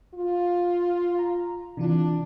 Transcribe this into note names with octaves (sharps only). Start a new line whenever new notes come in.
F4
A#5
C3 E3 D4 F4